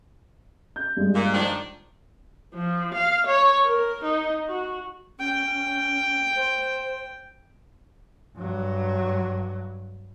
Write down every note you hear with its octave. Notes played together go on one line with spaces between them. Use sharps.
G6
G2 G#3
A#2
D#3 F3 D4
F3
F5
C#5
A#4
D#4
F#4
C#4 G5
C5
G2 F#3